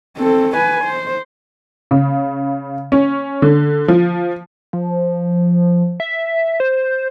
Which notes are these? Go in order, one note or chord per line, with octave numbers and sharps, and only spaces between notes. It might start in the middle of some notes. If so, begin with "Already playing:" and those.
C4 A4
B4 G#5
C5
C#3
C#4
D3
F3
F3
E5
C5